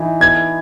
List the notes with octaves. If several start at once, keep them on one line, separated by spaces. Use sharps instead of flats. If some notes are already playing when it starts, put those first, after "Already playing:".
Already playing: E3 D#4
B3 G#6